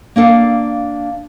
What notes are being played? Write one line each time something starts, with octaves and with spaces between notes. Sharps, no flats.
A#3 D4 A4 F5